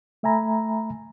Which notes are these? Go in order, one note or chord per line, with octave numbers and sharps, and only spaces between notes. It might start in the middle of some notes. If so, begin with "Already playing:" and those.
A3 E5 G#5 A#5 B5